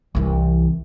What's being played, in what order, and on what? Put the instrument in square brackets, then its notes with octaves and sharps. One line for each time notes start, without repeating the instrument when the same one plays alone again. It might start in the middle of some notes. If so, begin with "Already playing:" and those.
[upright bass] C2 E3